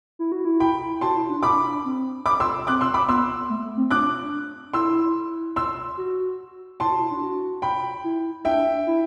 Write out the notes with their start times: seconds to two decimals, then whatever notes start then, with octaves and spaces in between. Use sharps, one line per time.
0.19 E4
0.32 F#4
0.45 E4
0.60 G5 B5
1.01 F#4 A5 C6
1.16 E4
1.29 D4
1.43 D4 B5 D6
1.85 C4
2.26 B5 D6
2.40 C6 E6
2.67 C4 D6 F#6
2.81 C6 E6
2.94 B5 D6
3.08 B3 C6 E6
3.49 A3
3.63 A3
3.77 C4
3.91 D4 D6 F#6
4.73 E4 C6 E6
5.56 C6 E6
5.98 F#4
6.80 E4 A5 C6
6.91 F#4
7.01 E4
7.11 D4
7.22 F#4
7.62 G5 B5
8.04 E4
8.45 D4 E5 G5
8.87 E4